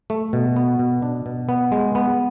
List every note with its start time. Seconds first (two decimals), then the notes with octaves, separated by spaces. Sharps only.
0.10 A3
0.33 B2
0.56 B3
0.79 B2
1.02 D4
1.26 B2
1.49 B3
1.72 G#3
1.95 B3